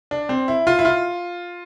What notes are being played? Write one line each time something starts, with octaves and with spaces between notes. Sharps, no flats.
D4
C4
E4
F4
E4
F4